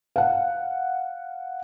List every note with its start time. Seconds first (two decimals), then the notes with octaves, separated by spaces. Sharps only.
0.16 F5 F#5